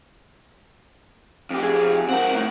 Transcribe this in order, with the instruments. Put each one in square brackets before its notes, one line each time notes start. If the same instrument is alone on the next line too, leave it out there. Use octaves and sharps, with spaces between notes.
[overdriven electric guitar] F2 G4
[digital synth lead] G#4
[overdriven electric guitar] C4 A#4 [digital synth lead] F#5
[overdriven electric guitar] A2